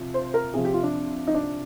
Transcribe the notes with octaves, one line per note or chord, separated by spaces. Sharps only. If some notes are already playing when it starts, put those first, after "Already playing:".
Already playing: C3 F3
C5
A#4
C3 F3 G#4
G4
F4
D4
D#4
D4